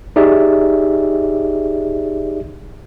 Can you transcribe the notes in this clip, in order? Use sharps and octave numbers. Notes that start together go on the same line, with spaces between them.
D#4 G4 G#4 D5 E5